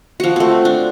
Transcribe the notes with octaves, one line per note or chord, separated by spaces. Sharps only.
F3 F#4
A3 C4
D4